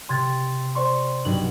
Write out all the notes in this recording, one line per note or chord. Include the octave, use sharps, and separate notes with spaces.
C3 C6 G#6 A6
C5 D5 C6 C#6
B1 G2 F#7